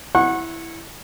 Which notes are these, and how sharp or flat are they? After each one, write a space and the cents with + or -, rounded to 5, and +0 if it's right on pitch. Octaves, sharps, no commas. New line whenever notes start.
E4 +0 F#5 -10 C#6 -35